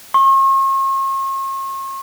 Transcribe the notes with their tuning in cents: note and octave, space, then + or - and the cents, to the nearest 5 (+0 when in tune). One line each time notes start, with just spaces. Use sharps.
C#6 -45